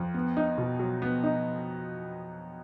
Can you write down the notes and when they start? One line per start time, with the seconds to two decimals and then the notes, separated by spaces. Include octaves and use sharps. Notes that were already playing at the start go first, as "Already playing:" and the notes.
Already playing: F2
0.14 B3
0.37 D#4
0.58 B2
0.79 F#3
1.02 B3
1.23 D#4